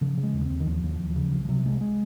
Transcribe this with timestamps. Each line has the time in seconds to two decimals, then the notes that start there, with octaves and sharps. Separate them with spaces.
0.01 C#3 F3
0.17 C#3
0.23 G#3
0.34 D#2
0.45 C4
0.51 D#2
0.60 D#3
0.66 D#2 F3
0.84 D#2
0.89 F3
1.00 D#2
1.10 F3
1.16 C#3
1.32 C2 F3
1.45 F3
1.49 C3 F#3
1.65 C2 G#3
1.81 G#3